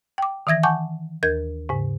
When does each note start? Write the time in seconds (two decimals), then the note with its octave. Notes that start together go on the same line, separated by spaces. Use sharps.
0.18 G5 D6
0.47 D#3 E3 E5 G#6 A#6
0.63 F#5 G#5 A5 C#6 D6 G6
1.23 D#2 A#4 G6 G#6
1.69 G#2 C#3